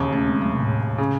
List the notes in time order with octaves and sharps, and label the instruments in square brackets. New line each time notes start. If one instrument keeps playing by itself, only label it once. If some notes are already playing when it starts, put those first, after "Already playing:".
Already playing: [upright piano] E1 D#2 C#3
[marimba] A3 C#4
G#3 C4
F#3 A3
C3
A2
[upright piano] C#3